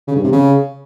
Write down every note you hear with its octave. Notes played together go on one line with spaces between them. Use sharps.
C#3
G2
C3
C#3